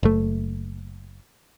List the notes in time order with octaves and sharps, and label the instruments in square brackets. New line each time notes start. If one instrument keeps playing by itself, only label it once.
[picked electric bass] F#1 A3